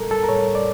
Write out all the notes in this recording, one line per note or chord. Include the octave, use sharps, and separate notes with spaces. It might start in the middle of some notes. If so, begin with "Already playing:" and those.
Already playing: A2 G3 A4 A#4
A4
A#4
A2 G3 C#5
D5